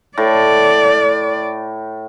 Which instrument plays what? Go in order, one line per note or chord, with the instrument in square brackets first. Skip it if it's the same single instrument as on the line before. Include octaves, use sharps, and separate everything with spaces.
[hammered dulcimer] A2 [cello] D5